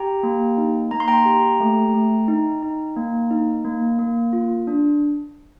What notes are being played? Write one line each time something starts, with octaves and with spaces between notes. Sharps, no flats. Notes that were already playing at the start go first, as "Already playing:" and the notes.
Already playing: G4 G5 A#5
A#3
D#4
A#3 A#5
C6
G5 A#5
G4
A3
A3
D#4
D#4
A#3
D#4
A#3
A#3
F4
D4